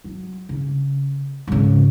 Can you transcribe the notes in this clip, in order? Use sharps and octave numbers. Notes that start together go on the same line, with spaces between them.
F#3
C#3
G#2 C#3